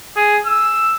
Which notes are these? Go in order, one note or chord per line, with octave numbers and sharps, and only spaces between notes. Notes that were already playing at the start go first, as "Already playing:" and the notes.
G#4
E6